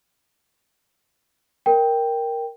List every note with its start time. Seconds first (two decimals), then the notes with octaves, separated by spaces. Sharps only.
1.66 A#4 G5